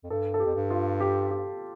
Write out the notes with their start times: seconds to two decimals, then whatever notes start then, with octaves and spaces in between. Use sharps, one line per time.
0.04 F2
0.10 G2 A4
0.34 A4
0.40 G4
0.46 F2
0.56 G2
0.71 F4
1.00 G4
1.31 G4